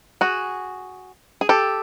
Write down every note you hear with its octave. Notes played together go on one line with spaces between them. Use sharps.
F#4 G#4
G#4
G4 A4